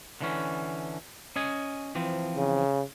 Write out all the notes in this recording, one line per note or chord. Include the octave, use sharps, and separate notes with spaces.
D3 E3 C#4
C#4 D#5 G#5
E3 F3 C4
C#3